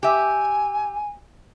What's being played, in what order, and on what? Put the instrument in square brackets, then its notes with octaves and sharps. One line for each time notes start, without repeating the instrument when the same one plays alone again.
[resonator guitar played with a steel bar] G4 E5 [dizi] G#5